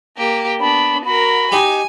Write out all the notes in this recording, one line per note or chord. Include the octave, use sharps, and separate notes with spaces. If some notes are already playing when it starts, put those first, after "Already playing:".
A#3 G4
B3 D4 B5
F#4 A#4 B5
D#4 G4 G#5